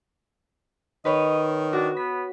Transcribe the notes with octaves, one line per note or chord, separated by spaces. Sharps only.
D#3 B4 C#5 D#5
D4 F#4
B3 B6